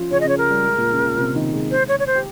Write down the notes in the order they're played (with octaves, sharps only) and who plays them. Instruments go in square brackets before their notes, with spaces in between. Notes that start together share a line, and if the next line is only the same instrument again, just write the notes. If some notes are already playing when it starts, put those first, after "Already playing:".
Already playing: [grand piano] F3 C#4 F4
[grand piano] C#3 C#4 [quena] C#5
[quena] D#5
[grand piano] C#3 C#4 [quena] C#5
[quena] A#4
[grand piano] G3
G#3
A#2 A#3
C#3 C#4
A#2 A#3
C3 C4
D#3 D#4
G#3 G#4
[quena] C5
C#5
C#5
C5
[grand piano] G4